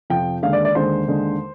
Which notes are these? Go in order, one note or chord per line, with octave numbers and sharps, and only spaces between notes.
F2 C3 F3 G5
D#2 D3 G#3 F5
D5
D5
D#2 D3 G#3 C5
D#2 D3 G#3